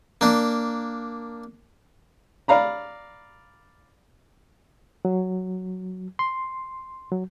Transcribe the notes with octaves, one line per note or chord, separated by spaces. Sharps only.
A#3 D4
D5 F5 A#5 B5
F#3
C6
F#3